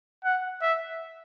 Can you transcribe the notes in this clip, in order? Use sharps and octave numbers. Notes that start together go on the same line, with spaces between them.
F#5
E5